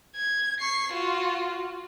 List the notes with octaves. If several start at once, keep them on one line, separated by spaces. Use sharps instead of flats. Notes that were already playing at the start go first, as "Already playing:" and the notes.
G#6
C#6 C7
F4 F#4